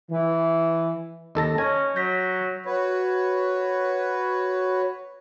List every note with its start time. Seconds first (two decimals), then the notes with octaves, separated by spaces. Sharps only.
0.11 E3
1.35 D#2 A4 D#5 A5 A#6
1.58 C#4 C#5 G#5 C#6
1.96 F#3 G6 A#6 B6
2.66 F#4 B4 C#5